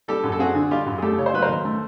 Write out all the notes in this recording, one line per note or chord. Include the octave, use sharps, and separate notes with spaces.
G3 G4 A4
F#2
A4
C4 F#4 G#4
D3
G3 F4 G4
F#2
G#4
A3 G4 A4
C#3 C#5
C5
F#3 B4
A#4 C5
D#2
A3